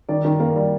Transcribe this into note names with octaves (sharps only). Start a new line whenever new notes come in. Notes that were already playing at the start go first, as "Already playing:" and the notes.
D#3 D5
D#3
A#3
G3